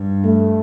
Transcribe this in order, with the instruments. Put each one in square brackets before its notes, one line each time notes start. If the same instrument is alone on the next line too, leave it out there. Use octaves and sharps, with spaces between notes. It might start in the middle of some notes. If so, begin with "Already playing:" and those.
Already playing: [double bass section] G2
[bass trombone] A3